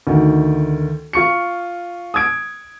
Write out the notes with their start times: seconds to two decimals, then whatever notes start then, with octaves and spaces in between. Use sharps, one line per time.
0.07 D2 D#3
1.13 F4 C#6 C#7
2.14 D#6 E6 G#6 D7